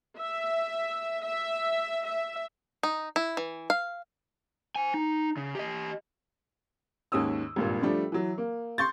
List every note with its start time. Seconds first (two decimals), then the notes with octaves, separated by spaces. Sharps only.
0.19 E5
1.24 E5
2.06 E5
2.83 D#4
3.16 E4
3.37 E3
3.70 F5
4.76 C5 G#5
4.94 D#4
5.37 C#3
5.55 G4 D#5
7.12 D#2 G#2 C#4 D#6 E6
7.56 G#1 G2 A#2
7.82 F3 G3 A3 D4
8.12 E3 F#3
8.38 A#3
8.78 C6 C#6 G6 A6